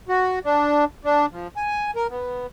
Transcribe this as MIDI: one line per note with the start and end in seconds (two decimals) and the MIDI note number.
0.09 0.39 66
0.45 0.85 62
1.05 1.26 62
1.32 1.47 53
1.57 1.91 80
1.96 2.07 70
2.10 2.46 59